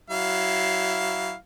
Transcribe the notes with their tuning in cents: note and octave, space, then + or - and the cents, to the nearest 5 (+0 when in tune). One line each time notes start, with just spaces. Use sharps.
F#3 +25 E4 +0 F5 +0